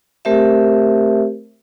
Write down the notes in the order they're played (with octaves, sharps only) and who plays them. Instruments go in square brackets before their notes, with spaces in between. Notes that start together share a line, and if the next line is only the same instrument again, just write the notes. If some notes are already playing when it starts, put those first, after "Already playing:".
[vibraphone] A3 C4 G4 A#4 C5 E5